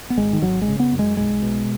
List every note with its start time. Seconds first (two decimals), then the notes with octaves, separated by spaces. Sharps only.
0.10 B3
0.18 G#1 G#3
0.33 D#3
0.42 G#1 F#3
0.62 G#3
0.68 C#3
0.80 B3
0.93 F#2
0.99 G#3
1.17 B1 G#3
1.42 B2